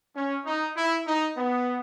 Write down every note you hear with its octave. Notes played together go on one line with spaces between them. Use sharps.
C#4
D#4
E4
D#4
B3